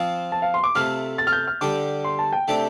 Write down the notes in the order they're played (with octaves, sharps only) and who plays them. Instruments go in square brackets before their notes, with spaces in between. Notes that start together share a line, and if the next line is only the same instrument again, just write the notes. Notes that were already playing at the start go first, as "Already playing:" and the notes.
Already playing: [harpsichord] F3 C4 F4 [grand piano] F5
[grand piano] A5
F5
C6
D6
[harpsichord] C3 A3 F4 [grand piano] F6
[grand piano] A6
F6
G6
F6
[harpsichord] D3 G3 D4 G4 [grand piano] D6
[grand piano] C6
A5
G5
[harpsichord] C3 A3 D4 G4